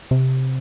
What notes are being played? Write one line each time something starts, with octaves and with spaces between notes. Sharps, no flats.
C3